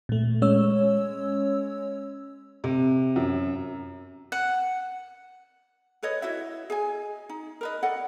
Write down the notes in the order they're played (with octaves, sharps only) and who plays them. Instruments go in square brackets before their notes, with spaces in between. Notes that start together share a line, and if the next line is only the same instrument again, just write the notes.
[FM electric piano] A#2 A3
G#3 C#4 C#5 E6
[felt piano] C3
F#2
[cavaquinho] F#5
[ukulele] A4 B4 C#5 D#5
E4 F#4 D#5 E5
G#4 D#5 G#5
D#4
A#4 B4 D#5
A4 D5 D#5 F#5